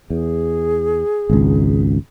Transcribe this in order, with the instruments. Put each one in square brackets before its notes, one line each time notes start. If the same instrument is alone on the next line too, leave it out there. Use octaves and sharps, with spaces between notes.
[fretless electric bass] E2 [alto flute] G#4
[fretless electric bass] G#1 C#2